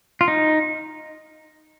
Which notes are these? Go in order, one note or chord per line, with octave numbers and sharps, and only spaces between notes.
F4
D#4